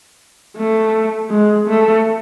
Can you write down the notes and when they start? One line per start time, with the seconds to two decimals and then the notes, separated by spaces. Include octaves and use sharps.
0.57 A3
1.30 G#3
1.67 A3